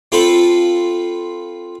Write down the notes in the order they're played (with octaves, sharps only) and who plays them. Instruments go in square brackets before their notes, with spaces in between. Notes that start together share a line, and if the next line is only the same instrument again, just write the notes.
[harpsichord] C4 F4 A4 B4